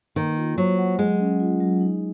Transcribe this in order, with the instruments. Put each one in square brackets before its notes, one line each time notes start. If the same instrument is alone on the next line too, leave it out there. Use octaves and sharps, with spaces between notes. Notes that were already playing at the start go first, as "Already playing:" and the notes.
[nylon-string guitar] D#3 [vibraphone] A#3
[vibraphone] F4
[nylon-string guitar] F#3 [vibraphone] C5
[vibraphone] F#5
[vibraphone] F#3 [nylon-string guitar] G#3
[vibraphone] C#4
F4
F#3
D#4